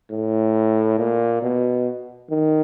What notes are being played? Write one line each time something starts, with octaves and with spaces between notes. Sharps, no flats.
A2
A#2
B2
D#3